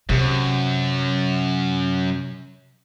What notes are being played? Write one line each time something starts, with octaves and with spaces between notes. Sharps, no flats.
F#2 C3